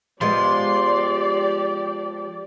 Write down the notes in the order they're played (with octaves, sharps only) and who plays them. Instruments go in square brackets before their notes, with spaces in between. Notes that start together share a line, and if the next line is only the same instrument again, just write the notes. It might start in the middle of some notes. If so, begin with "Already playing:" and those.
[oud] F3 G#3 B3 [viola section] G4 D5 [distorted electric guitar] C6